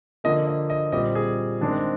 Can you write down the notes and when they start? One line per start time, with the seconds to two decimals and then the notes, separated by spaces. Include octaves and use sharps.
0.24 D3 F3 A#3 D#5
0.47 D#5
0.70 D#5
0.92 A#2 G3 C4 D#5
1.15 G#4
1.61 D#3 G#3 C4 D4